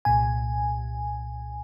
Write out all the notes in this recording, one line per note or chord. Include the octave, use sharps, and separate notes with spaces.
C2 A#2 G#5